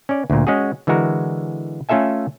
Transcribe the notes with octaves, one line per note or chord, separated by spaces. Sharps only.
C#4 D5
D2 A#2
G#3 C#4 F#4 G#4
D3 E3 G#3 F#4 A#4
A3 C#4 F4 A4 E5 G#5